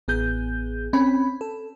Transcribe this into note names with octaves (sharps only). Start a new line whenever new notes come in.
A1 B3 G#4 G6
C4 C#4 B5
A4